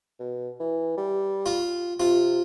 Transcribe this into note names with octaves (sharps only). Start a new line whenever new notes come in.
B2
E3
G3
F4
C3 F4